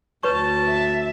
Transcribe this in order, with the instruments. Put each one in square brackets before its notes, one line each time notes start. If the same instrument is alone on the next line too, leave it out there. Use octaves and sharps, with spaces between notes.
[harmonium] D2 [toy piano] B4 C#5 C#6 [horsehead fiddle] A5
[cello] E5